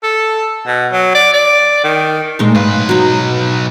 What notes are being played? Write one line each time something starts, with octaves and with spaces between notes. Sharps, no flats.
A4
B2
F#3
D5
D5
D#3
A#2 G#3 A3 D#4 C5
B1 G#2 B4 F5
F#3 D#4